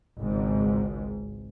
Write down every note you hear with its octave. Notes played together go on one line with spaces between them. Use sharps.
G#1 C#2 G#2